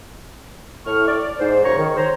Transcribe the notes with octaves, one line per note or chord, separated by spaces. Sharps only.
A2 C#6 F6
D5
G#2 C5
F#2 C#3 C5 C#5 A#5 C#6
D#3
C5 C#5 A#5